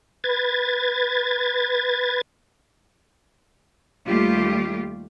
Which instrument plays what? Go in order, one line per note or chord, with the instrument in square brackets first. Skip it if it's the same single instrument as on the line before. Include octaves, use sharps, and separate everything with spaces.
[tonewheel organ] B4 G#6 A6
[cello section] D#2 G3 A3 F4 G4